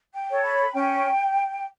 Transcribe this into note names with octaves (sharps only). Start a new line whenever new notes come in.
G5
A4 C#5
B5
C#4 G5